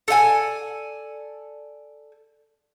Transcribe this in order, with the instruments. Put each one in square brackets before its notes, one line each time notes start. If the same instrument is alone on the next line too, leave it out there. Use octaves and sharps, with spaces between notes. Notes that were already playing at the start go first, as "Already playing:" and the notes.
[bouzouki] A4 D5 F5 G#5